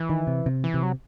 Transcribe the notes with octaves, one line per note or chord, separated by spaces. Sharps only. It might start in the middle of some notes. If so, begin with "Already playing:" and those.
Already playing: E3
D#3
C3
C3
E3
C3
F#3